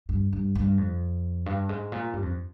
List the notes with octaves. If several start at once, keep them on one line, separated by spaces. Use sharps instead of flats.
G2
G2
G2
F2
G2
G#2
A#2
G2
F2